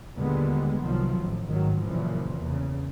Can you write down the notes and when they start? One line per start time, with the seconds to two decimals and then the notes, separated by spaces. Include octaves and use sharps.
0.16 D#2 A#2 D3 G3 G#3 B3
0.82 C2 D#3 F3 F#3
1.18 A1 A2
1.49 G#2 D#3 F#3
1.83 F#2 A#2 C#3 E3 F3
2.39 E2 C#3